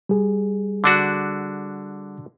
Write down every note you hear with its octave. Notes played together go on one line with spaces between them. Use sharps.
G3 G#4
D3 D4 F#4